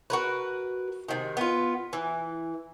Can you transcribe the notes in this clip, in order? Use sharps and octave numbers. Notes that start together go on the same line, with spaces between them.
F#4 A#4 B4
C3 D#3
B3 F4
E3